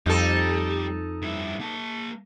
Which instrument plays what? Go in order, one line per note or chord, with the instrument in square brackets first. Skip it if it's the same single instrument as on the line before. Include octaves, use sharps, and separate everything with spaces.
[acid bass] F2 [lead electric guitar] G3 [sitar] D#4 A4
[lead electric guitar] G2 E4
A#3 A5